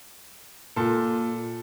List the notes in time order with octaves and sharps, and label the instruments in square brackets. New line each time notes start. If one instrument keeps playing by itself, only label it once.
[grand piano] A#2 A4